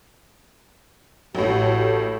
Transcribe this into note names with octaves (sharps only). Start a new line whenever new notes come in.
A1 A2 F#4 G4 A4